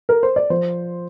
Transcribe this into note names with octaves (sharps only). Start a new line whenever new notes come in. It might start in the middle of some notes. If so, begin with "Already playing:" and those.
A#4
C5
D5
F3 C5